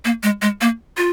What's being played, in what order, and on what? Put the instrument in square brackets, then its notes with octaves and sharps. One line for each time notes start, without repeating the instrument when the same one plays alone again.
[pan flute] A#3
G#3
G#3
A#3
F4